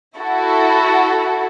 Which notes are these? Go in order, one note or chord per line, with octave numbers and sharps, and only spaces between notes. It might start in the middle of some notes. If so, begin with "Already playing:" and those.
E4 F#4 A4